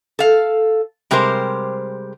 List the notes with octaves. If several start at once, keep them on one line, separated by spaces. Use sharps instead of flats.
A4 F5
C3 G3 G#3 G4 A#4 C5